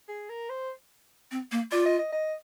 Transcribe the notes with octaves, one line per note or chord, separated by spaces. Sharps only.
G#4
A#4
C5
C4
A#3
F4 D5
D#5
D#5
D#5